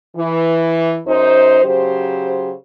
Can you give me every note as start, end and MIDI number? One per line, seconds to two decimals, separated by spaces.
0.16 0.99 52
1.07 1.61 42
1.07 1.61 63
1.07 1.61 72
1.64 2.53 49
1.64 2.53 54
1.64 2.53 67
1.64 2.53 72